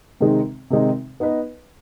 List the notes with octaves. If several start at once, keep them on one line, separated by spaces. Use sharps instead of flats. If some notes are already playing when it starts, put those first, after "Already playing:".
C3 D#3 G#3 C4 D#4
C3 D#3 G#3 C4 D#4
B3 D#4 B4 D#5